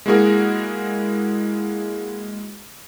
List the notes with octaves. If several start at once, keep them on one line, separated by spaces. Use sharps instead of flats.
G#3 A#3 E4 F#4 G#4 A#4